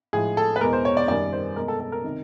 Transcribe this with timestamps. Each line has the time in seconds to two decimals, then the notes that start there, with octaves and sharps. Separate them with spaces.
0.13 A2 F3 G#3 G#4
0.37 A4
0.56 B4
0.61 E2 B2 G#3 A#4
0.73 C5
0.85 C#5
0.97 D5
1.08 F#2 D#3 G3 D5
1.33 C5
1.56 B2 G#3 A#4
1.68 A4
1.80 A4
1.92 A#4
2.04 C3 D#3